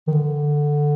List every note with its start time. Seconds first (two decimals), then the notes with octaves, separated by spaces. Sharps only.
0.07 D#3
0.12 D3